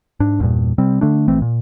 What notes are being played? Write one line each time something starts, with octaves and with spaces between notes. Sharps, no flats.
G#2 D4
A1 E2 G2 A#2
C3 G3 C4
D3 A3 D4
A#1 E3 A3 C4
A#2